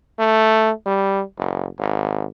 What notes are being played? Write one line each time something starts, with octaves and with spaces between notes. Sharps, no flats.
A3
G3
F#1
G#1